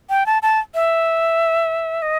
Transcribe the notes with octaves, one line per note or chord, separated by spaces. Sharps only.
G5
A5
A5
E5
D#5